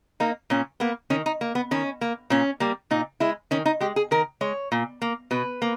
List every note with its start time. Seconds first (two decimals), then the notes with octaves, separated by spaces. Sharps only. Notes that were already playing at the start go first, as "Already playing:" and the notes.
0.20 A#3 D#4
0.50 A#2 C#4
0.80 A#3 B3
1.10 D#3 C#4
1.26 D#4
1.41 A#3
1.55 B3
1.71 D#3 C#4
2.01 A#3
2.30 A#2 C#4
2.60 G3 A#3
2.91 A#2 D#4
3.20 G#3 E4
3.51 D#3 C#4
3.66 D#4
3.80 G#3 G4
3.96 G#4
4.11 D#3 A#4
4.41 G#3 C#5
4.72 A#2
5.02 A#3
5.31 B2 B4
5.62 A#3